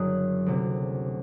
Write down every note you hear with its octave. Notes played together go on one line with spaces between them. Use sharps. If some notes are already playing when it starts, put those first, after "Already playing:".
Already playing: F#1 F#2 D3 F#3 D#6 F#6
D2 C3 F#3